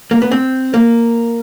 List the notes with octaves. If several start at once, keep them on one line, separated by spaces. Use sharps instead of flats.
A#3
B3
C4
A#3